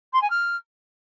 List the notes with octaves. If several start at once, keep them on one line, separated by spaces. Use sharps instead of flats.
C6
G#5
F6